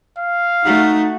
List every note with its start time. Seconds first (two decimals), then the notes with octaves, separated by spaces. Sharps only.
0.18 F5
0.65 A3 D#4 F#4